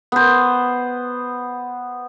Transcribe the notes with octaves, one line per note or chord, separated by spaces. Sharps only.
B3 C5